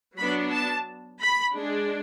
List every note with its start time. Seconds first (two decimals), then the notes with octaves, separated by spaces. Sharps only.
0.18 F#3 B3 D4 B5
0.52 A5
1.21 B5
1.54 G#3 D4